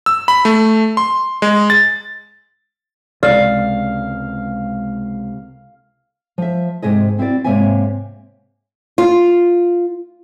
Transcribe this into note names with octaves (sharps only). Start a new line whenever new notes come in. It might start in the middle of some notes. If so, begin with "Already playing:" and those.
E6
B5
A3
C6
G#3
A6
C#2 C3 G#3 D5 F5
F3 E5
G#2 C3 G#4 D#5
C4 E4 F#4 D5
G#2 C3 A#3 C#5 E5 G#5
F4